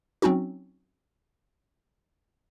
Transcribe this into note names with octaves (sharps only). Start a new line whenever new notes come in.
F#3 C4 C#4 D#4 F#4